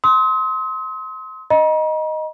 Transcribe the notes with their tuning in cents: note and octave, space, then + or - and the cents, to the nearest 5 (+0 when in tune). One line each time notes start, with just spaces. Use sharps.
C6 +0 D#6 +45
D#5 +0 A#5 +40